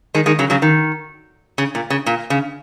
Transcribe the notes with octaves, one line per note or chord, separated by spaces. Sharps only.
D#3 G#3
D#3 G#3
C#3 F#3
C#3 F#3
D#3
C#3
A#2
C#3
A#2
C#3